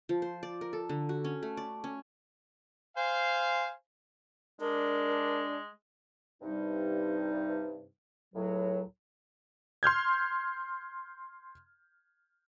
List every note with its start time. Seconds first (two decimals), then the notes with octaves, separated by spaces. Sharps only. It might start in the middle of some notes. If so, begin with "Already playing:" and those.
0.09 F3
0.22 C5
0.43 D5
0.61 A#4
0.73 A4
0.89 D3
1.09 F#4
1.24 C#4
1.43 A3
1.57 D5
1.84 C#4
2.97 C5 F5 G#5
4.61 G#3 D4 A#4
6.42 G2 C3 G3 D#4
8.34 C#2 A2 F#3
9.83 C6 F6 G6 G#6